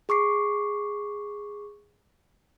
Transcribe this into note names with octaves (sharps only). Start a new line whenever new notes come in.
G#4 C#6 D6 C7